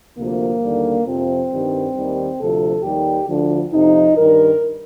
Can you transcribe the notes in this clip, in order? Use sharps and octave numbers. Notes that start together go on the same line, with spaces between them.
D2 C3 F3 A#3
D#2 D3 G3
F2 C3 F3 C4
G2 D#3 G3
D#2 D#3 G3
D2 C3 F3 A4
D#2 D#3 G3 G4
D2 D3 F3
F2 C3 F3 D#4
G2 D#3 G3 A#4